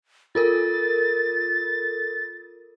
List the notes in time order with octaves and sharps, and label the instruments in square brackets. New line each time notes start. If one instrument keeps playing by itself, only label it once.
[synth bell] F4 A4 A#4 [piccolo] A6